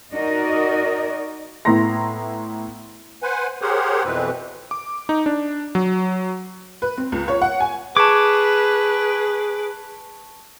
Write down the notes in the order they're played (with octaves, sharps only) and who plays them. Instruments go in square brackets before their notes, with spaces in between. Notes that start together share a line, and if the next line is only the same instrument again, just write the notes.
[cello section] D#4 F#4 A#4 D5 D#5
[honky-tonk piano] A2 B3 E4 A#5 C6 A#6
[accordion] B4 C5 F#5 G#5
G4 G#4 A#4 C5 C#5 F#5
F2 B2 E3 C4 B4
[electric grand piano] D6
D#4
D4
F#3
[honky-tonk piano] B4
C4
C#2
C#5
F#5
G#5
[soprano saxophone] G#4 [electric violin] B4 [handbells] A5 C#6 G#6 [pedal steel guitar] D6